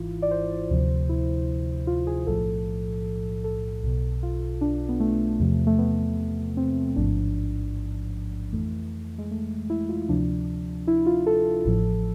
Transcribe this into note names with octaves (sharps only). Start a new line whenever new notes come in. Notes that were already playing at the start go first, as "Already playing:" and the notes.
Already playing: G#1 G#2 E3 E4 F4
D5
C5
D2 C3 F3
E4
F4
G#4
B1 A2 F3 A4
A4
B1 B2
F4
D4
B3
A3
E2 C3 F3
A3
B3
C4
A1 G#2 F3 D4
F2 E3 A3
G#3
A3
E4
F4
D2 C3 F3 D4
E4
F4
A4
A1 A2 F3